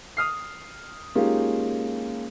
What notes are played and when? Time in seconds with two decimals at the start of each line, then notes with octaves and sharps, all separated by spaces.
0.17 D#6 F6 C7
1.15 G#3 A#3 C#4 D#4 F4 G4